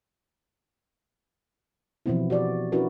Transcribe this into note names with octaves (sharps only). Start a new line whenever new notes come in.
B2 E3 F3 B3 C4 E4
F#4 G4 D5
C#4 D4 E4 F#4 A#4 B4